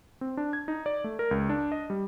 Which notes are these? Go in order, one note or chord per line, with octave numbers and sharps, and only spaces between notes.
C4
D4
G#6
D#4
D5
A3
A#4
C#2
D4
D#5
G3